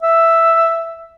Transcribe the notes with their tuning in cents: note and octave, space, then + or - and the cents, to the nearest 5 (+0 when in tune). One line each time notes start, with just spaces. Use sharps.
E5 +5